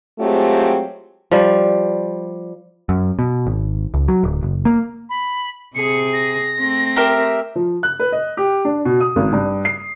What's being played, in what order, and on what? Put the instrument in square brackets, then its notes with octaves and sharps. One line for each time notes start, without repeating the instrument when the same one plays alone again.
[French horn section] F#3 G#3 A3 C4 F4 G4
[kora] F3 G3
[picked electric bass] F#2
B2
G#1
C#2
F#3
D1
F#1
A#3
[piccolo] B5
[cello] C3 G#4 [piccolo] C#7
[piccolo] A#6
[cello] A3 C4
[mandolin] G4 A#4 E5
[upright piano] F3
F#6
B4
D#5
G4
D4
B2
D#6
G#1
G2
C7